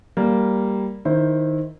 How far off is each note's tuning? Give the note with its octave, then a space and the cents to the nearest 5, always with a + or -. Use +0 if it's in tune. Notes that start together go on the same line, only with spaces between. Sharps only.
G3 +0 A#3 +0
D#3 +0 E4 -10 C5 +5